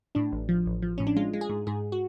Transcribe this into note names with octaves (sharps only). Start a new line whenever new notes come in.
A2 D4
A1
F3
A1
F3
A2 C#4
D4
G#3 F4
G#3
G#4
G#2
G#2 G#4
F#4